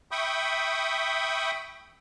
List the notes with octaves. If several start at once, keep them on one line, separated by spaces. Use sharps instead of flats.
E5 G5 B5 C#6 D#6